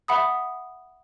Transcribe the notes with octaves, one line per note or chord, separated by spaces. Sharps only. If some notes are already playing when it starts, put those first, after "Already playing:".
E5 F#5 B5 D#6